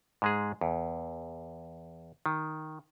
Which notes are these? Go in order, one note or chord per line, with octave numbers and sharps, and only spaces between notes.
G#2 G#3 G#4
E2
D#3